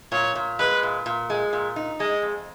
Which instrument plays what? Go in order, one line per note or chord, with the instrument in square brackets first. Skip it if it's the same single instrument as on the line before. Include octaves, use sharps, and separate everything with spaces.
[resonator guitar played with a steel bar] A#2 [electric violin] C#5
[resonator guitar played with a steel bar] A#2
[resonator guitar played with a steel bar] G#3 [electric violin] B4
[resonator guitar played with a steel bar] A#2
A#2
G#3
A#2
D#4
[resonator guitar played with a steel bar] G#3 [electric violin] D#5
[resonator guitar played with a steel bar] F2